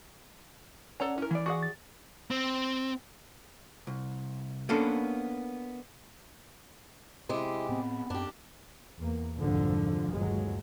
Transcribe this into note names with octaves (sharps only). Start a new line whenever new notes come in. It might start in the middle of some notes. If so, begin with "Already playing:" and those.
C#4 A4 C#5 D5 F#5 A#5
C#4 E4 A#4
E3 D5
F#4 G#4 F#5 C#6
A6
C4
C2
A#3 B3 C#4 D4 A4
C3 G#3 E4 G4
A2 B3 C4
F#2 C4 D4 G4
E2 A#3
C2 F2 G#2 D3 F3
G1 D#2 A#2 F#3 G#3